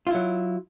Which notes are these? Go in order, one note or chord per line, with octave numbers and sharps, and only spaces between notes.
F#3 E4 F4